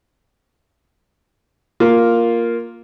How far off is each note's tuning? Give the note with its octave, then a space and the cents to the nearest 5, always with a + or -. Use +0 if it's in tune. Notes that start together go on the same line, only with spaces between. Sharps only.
A#3 +0 F4 +0